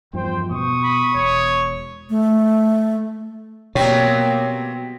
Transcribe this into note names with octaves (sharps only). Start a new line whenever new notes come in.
E2 G2 F3 C5 G5
B2 C#6 D#6
B5
E1 C#5
A3
B2 F#3 G3 A#3 C4 C#5 G5